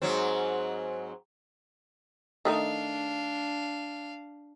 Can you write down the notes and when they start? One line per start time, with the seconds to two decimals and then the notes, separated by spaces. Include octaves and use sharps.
0.02 G#2 F#3 C4
2.45 D#3 A3 D4 D#4 F5